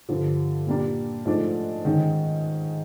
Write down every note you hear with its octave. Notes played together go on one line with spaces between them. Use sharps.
G2 D3 F3
A#2 G3 A#3 D4
G#2 F3 A3 D4
G#2 D#3 G#3 C#4